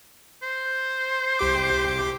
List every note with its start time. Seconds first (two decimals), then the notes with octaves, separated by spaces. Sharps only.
0.43 C5
1.39 C2 G4 D6